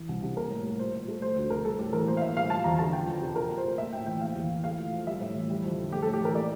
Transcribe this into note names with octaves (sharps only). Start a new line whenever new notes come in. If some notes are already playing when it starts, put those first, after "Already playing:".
Already playing: E3
C2
C3
A#3 A#4
A2
G3
A#2 C5
A#2
A3
F3 C5
D2 C5
C3 A#4
G3 A4
A2 G4
E3 A#4
A#3 C5
F5
A2 E5
G3 F5
F3 A5
E2 A#5
D3 A5
F3 G5
F2
C3
A#2 A#4
A#2
C5
A3
A#3 E5
A2 G5
E3 G5
A#3 F5
E2
E3
A3 F5
A#2
F3
G3 E5
A2
E3
G3
F2
D3
A3 G4
A4
A2
G4
E3 A#4
A#3 D5